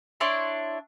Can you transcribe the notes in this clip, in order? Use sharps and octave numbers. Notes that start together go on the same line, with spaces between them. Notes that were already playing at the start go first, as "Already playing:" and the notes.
D4 E4 C#5 C6